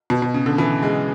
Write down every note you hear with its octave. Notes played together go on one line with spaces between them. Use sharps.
B2
B2
C#3
D3
E3
G#3